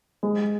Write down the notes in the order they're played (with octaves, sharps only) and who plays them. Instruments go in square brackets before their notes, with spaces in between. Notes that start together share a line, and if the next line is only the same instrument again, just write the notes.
[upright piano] G#3